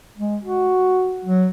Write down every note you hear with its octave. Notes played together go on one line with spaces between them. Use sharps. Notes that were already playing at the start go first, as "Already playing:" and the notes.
G#3
F#4
F#3